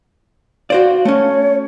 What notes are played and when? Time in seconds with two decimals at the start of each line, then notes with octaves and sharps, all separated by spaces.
0.70 F#4 C5 D5 F5
1.05 A3 C#4 C#5